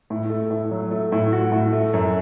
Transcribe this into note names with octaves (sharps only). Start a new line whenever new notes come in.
A2
A3
A2
F#3
A3
A2
F#4
A2
A3
F#2